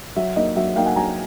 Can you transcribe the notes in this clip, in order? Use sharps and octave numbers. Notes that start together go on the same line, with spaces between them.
F#3 E5
A#3 D#4 D#5
F#3 E5
A#3 D#4 F5 G5
F#5 G#5
F#3 G#5 A#5